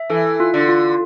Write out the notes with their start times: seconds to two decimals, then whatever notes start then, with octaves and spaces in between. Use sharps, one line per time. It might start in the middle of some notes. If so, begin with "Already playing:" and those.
Already playing: E5
0.10 E3 A4
0.40 F4
0.54 D3
0.69 F4